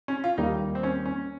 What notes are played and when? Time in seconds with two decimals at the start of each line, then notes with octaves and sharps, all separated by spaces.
0.08 C#4
0.24 F4
0.38 D#2 D#3 G3 A#3 D#4
0.75 C4
0.83 C#4
1.06 C#4